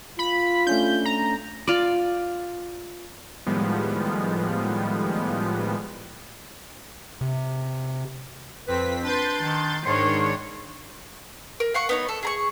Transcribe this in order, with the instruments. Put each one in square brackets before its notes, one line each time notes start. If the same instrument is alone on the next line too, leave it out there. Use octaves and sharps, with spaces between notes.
[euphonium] F4 [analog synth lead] B5
[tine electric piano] A3 C#4 D4 [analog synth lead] G6
[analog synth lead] A#5
[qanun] F4 D5
[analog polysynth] A2 D#3 F3 G3 G#3 B3
[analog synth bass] C3
[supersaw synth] F2 C4 B6 [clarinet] B4
[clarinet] D4 [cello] B4 [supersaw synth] C6 G6 A6
[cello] D#3
[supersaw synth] G#2 D#3 D4 [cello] C#5 [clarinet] C6
[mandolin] A#4
F5 F#5 C#6
B3 D#4 C#5
A4
G#4 A#5 C#6